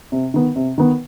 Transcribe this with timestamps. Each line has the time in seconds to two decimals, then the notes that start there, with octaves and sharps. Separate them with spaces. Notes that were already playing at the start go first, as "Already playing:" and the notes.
0.12 C3
0.34 D#3 B3
0.56 C3
0.78 D#3 B3